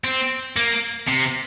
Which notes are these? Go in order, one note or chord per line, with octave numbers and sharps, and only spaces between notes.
C4
A#3
C3